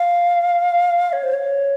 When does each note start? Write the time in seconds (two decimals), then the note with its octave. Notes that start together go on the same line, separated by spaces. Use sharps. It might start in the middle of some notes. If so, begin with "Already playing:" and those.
Already playing: F5
1.13 C#5
1.23 C5
1.33 C#5